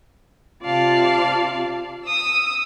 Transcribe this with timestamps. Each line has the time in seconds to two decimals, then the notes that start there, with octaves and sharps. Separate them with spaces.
0.63 C3 F4 D5 F5 A5
2.05 D#6 E6